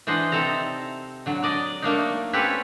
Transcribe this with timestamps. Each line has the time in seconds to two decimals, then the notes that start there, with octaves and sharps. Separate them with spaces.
0.07 E3 D4 C5 D#5 F#5
0.32 C3 C4 D#4 A4 A#5
1.26 D3 F#3
1.43 D4 D5 D#5
1.82 A3 A#3 D4 D#4
2.33 C4 C#4 G4 A4 B4 C#5